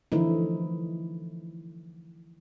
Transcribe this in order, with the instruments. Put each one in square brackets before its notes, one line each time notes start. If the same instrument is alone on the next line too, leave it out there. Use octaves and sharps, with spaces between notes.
[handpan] D3 E3 F3 A3 D#4 E4